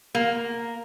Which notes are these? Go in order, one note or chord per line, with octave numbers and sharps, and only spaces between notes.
A#3